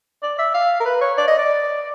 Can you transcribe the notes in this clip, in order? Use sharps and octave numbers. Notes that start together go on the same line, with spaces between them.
D5
E5
F5
A#4
B4
C#5
D5
D#5
D5